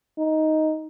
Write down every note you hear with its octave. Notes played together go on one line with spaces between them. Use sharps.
D#4